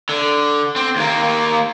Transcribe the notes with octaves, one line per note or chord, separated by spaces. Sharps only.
D3
C4
D#2 A#3